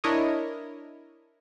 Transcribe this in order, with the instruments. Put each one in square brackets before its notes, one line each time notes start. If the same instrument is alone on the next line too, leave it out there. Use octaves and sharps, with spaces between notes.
[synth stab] D4 E4 A#4 C#5 D#5